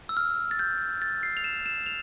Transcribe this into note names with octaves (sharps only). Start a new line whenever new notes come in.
E6
F6
A6
G6
A6
C7
F7
E7
E7
F7